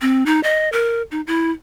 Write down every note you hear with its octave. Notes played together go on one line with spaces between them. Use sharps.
C4
D#4
D#5
A#4
D#4
E4